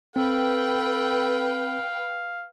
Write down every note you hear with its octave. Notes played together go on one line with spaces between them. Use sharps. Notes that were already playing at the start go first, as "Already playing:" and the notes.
C4 A4 B4 F5 G5